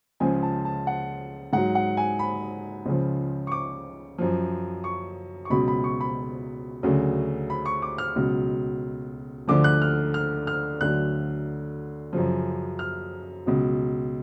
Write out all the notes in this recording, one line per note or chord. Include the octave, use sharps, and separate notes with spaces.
C#2 C#3 F3 G#5
A5
A5
F#5
G#2 F#3 F#5
F#5
G#5
B5
C#2 C#3 F3
C#6
D6
F#2 F3
C#6
C#6
C#2 B2 F#3 B5
B5
C#6
B5
D2 C#3 F#3
B5
C#6
D6
F6
C#2 B2 F#3
D2 D3 F3 D6
F#6
F6
F6
F6
D2 D3 F#3 F#6
F#2 C#3 F3
F6
C#2 B2 F#3